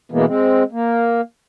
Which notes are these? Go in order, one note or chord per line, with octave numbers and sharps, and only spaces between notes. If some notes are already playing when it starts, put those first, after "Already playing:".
B2 E3 G#3 A#3 B3
G#3 C4
A#3